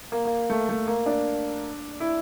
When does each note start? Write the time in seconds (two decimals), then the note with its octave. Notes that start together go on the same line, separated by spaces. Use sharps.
0.12 A#3
0.25 A#3
0.50 A3
0.69 A3
0.87 A#3
1.06 D4
2.00 E4